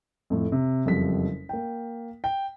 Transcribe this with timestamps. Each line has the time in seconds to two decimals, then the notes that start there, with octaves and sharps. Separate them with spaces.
0.30 F2 A2
0.52 C3
0.86 F#1 F2 G3 B6
1.49 A#3 G5
2.24 G5